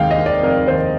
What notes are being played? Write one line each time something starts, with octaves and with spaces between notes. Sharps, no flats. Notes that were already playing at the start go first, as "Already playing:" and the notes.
Already playing: F1 D#2 D#3 G#3 F5 G5
D#5
D#3
D5
F1 A#4
D#2 C5